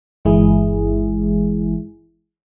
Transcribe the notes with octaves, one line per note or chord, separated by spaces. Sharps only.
G1 E3 G#3 E4 G#4